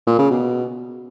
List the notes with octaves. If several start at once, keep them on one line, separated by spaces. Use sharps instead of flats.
A#2
C#3
B2